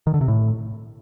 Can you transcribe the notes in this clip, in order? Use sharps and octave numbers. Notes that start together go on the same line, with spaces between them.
D#3
D3
C3
A2